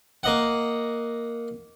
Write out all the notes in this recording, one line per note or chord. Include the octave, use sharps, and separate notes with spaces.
A#3 D#5 F#5